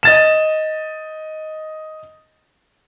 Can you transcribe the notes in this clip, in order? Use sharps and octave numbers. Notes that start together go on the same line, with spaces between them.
D#5 A6 E7